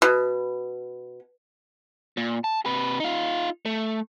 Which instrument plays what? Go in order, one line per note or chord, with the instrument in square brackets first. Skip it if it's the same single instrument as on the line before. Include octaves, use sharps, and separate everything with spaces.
[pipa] B2
[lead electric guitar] A#2
A5
C3 B4
D#4 F4
A3